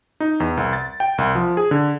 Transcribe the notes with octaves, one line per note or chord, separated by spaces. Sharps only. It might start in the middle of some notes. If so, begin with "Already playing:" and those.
D#4
E2
C2
A6
G5
C2
F3
G#4
D3